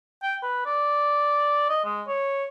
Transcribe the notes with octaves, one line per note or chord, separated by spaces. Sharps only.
G5
B4
D5
D#5
G#3
C#5